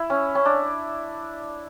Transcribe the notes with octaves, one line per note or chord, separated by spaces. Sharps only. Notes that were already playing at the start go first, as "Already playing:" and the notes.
Already playing: E4
C#4
C#4
D4